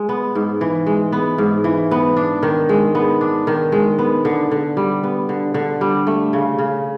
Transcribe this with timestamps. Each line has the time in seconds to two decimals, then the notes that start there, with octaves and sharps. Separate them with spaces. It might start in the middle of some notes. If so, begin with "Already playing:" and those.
Already playing: G#3
0.09 B3
0.35 G#2
0.61 E3
0.86 G#3
1.12 B3
1.38 G#2
1.64 E3
1.91 B3
2.17 D4
2.43 D#3
2.69 G#3
2.95 B3
3.21 D4
3.47 D#3
3.72 G#3
3.99 B3
4.25 D3
4.51 D3
4.77 G3
5.03 B3
5.29 D3
5.54 D3
5.81 G3
6.07 A3
6.33 C#3
6.59 C#3